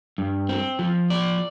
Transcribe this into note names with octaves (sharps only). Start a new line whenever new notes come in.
G2
C4
F3
D5